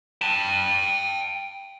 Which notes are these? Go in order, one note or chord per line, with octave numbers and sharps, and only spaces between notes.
G5 A5